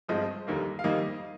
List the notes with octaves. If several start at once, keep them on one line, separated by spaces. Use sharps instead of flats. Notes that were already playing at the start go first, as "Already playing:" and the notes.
G1 G2 F3 G#3 C4 D#5
F1 D#2 D3 G3 A#3
F5
F2 D#3 G3 A#3 D#5